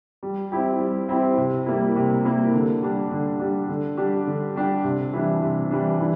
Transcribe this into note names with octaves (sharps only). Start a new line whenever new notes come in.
G3
C4 E4 G4
G3
C4 E4 G4
C3
G3 A#3 E4
C3
G3 A#3 E4
D3
G3 D4
D3
G3 D4
D3
G3 D4 G4
D3
G3 D4 G4
C3
E3 G3 D4
C3
E3 G3 D4
E3